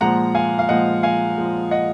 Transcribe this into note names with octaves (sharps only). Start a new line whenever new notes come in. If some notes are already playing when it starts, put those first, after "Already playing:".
A#2 F3 G#3 F#5 A#5
F5 G#5
F5
A#2 F3 G#3 D#5 F#5
F5 G#5
A#2 F3 G#3
D#5 F#5